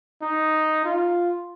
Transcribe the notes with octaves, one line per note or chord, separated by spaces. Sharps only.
D#4
F4